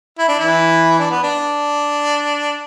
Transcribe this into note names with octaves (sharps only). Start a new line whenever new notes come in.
E4
D4
E3 E4
D4
B3
D4